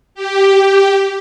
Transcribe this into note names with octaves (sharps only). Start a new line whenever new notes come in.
G4